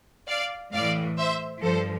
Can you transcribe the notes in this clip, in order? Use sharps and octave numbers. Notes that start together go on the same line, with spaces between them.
D5 F5
A2 E3 D5 F5
C5 E5
G2 F3 A4 C5